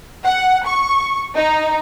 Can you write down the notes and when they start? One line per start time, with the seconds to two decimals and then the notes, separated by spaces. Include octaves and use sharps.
0.24 F#5
0.66 C#6
1.34 D#4